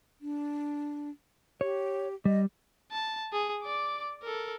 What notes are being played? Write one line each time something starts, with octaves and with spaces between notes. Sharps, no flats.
D4
G4 C#5
G3 D#5
A5
G#4
D5 D6
A4 A#4